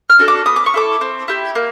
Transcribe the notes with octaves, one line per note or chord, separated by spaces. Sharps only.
F6
D4 F#4 A4
D6
B3 D#6
D6
C#6
E4 A4 D6
C4
E4 G4
A#3